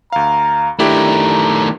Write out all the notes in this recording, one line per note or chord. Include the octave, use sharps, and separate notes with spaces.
D2 F5 A#5
D#3 A3 D4 E4 G4 A#5